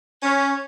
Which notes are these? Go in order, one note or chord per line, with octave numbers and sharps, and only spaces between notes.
C#4